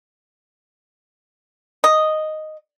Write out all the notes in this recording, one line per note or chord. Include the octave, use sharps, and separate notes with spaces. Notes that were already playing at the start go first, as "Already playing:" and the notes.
D#5